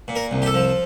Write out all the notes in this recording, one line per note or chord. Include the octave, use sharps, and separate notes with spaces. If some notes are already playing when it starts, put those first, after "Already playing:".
A#2
A#4
C2
G4
A4
F3